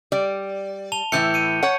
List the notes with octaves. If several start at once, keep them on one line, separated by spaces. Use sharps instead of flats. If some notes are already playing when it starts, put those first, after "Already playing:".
G3 D5
A5 F7 G7
A2 E3 E4 G6 C#7
C#7 D#7
C#5 F#5